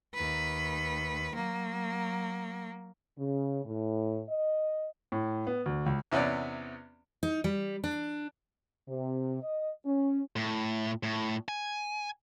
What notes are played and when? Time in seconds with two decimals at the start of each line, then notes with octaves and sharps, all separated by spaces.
0.14 D#2 B4
1.35 F#3 A#3
3.18 C#3
3.65 A2
4.28 D#5
5.12 A2
5.47 B3
5.66 D2
5.86 C#2
6.12 E2 C3 B3 C#4 D5
7.23 D#4
7.44 G3
7.84 D4
8.88 C3
9.43 D#5
9.85 C#4
10.36 A2
11.03 A2
11.48 G#5